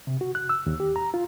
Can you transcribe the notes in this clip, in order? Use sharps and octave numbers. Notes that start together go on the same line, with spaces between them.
C3
F#4
F#6
E6
D#2
G4
A#5
F4